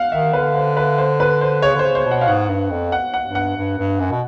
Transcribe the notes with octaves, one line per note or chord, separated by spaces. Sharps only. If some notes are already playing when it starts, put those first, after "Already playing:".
Already playing: F5 F#5
D#3 E5
D3 B4
C5
B4
C5
B4
C5
C#3 C#5
D3 C5
C#3
C5
B2
F#5
F5
G#2 F#5
G2
F2
F#5
F#5
G2
F#5
G2
G2
F#2
B2